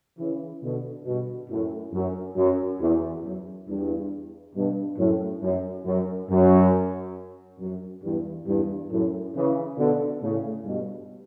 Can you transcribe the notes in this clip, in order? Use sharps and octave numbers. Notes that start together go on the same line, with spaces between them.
C#3 E3
B2 D3
G2 B2
F#2 A2
F#2
F#2
E2
F#2
E2 G2
G2 B2
F#2 A2
F#2
F#2
F#2
F#2
E2 G2
E2 G2
F#2 A2
C#3 E3
B2 D3
A2 C#3
G2 B2